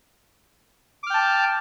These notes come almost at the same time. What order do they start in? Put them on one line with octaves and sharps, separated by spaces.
D6 F6 G5 A5